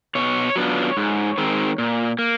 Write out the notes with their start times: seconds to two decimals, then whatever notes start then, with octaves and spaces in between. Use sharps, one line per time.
0.15 B2 C#5
0.56 F#3 B3 D4 F4
0.97 G#2
1.38 D#3 G#3 C4
1.78 A#2
2.19 A#3